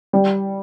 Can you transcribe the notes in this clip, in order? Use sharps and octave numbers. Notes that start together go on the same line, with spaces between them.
G3